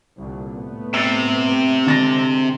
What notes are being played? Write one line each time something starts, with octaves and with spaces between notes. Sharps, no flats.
C2 A#2 D3
A2 A3 B3
C3 E6 A6
D3 G#3 A6 A#6